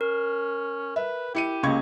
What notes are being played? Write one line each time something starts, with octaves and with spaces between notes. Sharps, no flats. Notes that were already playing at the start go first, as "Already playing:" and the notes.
C#4 A#4
B4 E5
E4 G4 C#7 D#7
C#2 A#3 C#4 C#6 G#6